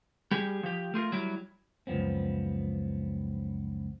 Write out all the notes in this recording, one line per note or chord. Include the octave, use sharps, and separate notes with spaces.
G3 G4 G#4
F3 G4
A3 F4 G#4 A#4
F#3 G3 E4
C#2 F#2 F3 B3 C4